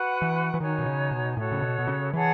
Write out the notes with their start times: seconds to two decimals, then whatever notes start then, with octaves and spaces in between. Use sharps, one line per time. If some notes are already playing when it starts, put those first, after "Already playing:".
Already playing: F#4 B4 F#5
0.22 E3
0.54 E3
0.60 D#3 D#4 F#4 C#5 G#5
0.79 B2
0.86 C#3
1.11 B2
1.37 A2 F#4 A4 C#5
1.52 C#3
1.62 B2
1.79 B2
1.87 C#3
2.13 E3 G#4 C#5 F#5 A5